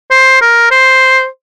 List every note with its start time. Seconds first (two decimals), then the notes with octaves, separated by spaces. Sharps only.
0.11 C5
0.41 A#4
0.71 C5